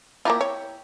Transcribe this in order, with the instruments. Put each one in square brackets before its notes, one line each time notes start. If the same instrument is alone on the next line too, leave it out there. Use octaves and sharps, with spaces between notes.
[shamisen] A#3 F4 [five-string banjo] E4 G4 A#5
[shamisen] C#5